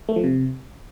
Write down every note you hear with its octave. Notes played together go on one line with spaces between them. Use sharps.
A3
F3
C3